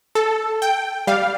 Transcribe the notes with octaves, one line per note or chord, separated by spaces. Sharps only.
A4
G5
G3 F5